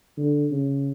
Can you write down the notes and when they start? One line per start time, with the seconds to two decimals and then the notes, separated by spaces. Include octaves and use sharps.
0.18 D3
0.51 C#3